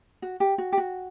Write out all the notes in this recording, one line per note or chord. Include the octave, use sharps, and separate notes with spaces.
F#4
G4
F#4
G4
F#4